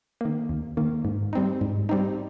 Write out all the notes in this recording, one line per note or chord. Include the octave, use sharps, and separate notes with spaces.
D#3 A#3
D#2
D#3 A#3
G#2
G3 C4 D#4
G#2
G3 C4 D#4